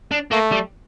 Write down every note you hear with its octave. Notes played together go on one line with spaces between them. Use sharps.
D4
A3 A#3
G3